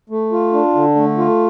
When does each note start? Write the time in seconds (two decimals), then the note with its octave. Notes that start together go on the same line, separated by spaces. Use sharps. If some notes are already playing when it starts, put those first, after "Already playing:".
0.10 A3
0.32 F4
0.53 D4
0.75 D3
0.95 A3
1.18 F4